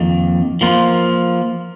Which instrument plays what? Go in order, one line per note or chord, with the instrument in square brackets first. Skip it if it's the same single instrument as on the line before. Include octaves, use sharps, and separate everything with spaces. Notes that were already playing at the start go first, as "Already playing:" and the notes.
Already playing: [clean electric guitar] F2 D#3 A#3
F3 A#3 F4